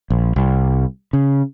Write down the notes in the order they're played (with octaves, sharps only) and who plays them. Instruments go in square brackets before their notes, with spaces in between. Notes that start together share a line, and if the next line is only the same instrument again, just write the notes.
[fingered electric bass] A#1
C2
C#3